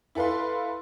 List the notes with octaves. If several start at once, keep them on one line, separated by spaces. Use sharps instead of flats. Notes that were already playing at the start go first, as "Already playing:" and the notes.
E4 A4 B4 F5 C6